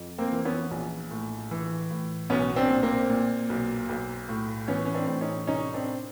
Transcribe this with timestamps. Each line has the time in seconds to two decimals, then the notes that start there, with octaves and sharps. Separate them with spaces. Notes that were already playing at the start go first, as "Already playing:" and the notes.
Already playing: F2
0.18 A#3 C4
0.32 E3
0.45 B3 C#4
0.71 A#1
1.11 A2
1.51 E3
1.91 A2
2.30 B1 B3 C#4
2.56 C4 D4
2.69 A#2
2.83 A#3 C4
3.10 A#2
3.49 B1
3.89 B1
4.29 A2
4.68 E3 B3 C#4
4.85 C#4
4.95 C4 D4
5.07 A2
5.21 C#4 D#4
5.47 C2 C#4 D#4
5.74 C4 D4